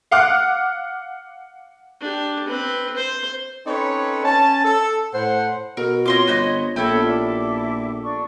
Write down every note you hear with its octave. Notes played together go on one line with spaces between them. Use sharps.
F5 F#5 D6 F6 F#6
D4 G4
C4 B4
C5
C4 C#4 D#4 A4 B4 C#5
C#4 A5
A4
A2 C5 F#5
B2 A#4
C4 F4 C#5 D#5 C6 D6
G1 B4 C5 D#5
A#1 B3 G4 A4 C#5 E5 B5
E4 F4 D5 D6
D4 C#6